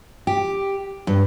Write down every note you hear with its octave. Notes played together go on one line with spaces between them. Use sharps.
G4
G2